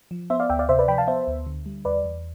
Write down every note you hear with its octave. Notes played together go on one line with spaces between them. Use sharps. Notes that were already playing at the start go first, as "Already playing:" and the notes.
F3
B3 C5 E5
D5 F5
D2 E5 G5
D5 F5
C3 C5 E5
B4 D5
F3 G5 B5
F5 A5
B3 C5 E5
D2
D3
G3
E2 B4 D5
E2